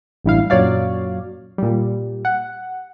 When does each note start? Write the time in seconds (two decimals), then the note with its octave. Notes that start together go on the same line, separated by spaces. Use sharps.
0.24 A1 G2 E4 F5
0.50 F#2 A#2 F#3 C#5 D5 F5
1.58 A#2 G3
2.25 F#5